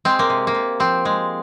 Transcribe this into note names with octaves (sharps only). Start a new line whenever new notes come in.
G#3 C4
A#3
C3
A#3
C3
F3 C4
G#3